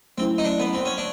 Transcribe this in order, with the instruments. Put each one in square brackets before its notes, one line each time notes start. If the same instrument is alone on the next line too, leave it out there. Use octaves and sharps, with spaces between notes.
[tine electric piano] F#3 A3 C#4 E4 [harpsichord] C4
[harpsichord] D#4
D4
B3
C4
C#4
D4